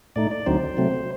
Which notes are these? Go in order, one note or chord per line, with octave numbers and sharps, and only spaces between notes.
A2 A3 D#4 D5
D5
D2 D3 F#3 C4 D#4 C5
C3 F#3 A3 C4